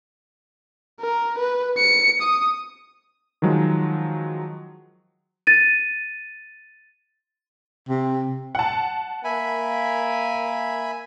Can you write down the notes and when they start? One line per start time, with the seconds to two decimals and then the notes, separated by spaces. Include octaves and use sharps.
1.01 A#4
1.39 B4
1.78 C#7
2.22 D#6
3.42 D#3 F3 F#3 G#3
5.47 A6 D#7
7.89 C3
8.55 F#5 A5
9.24 A#3 E5 G#5 B5